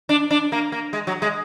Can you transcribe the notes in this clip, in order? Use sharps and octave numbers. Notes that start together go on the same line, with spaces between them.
D4
D4
A#3
A#3
G#3
F#3
G#3